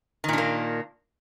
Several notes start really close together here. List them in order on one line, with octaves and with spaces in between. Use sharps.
D#3 A#2 D4 A#3